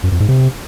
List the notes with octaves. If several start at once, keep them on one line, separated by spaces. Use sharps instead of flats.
F#2
F2
G#2
C3